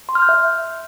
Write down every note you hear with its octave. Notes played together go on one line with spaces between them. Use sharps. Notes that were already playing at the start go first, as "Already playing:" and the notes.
C6
F6
G6
E5